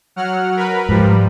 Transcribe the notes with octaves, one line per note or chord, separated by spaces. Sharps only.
F#3 F#5 F6
A#4 B4 B5
G#2 F3 G3